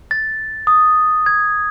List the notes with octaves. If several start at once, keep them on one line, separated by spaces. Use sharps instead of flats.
A6
D#6
G#6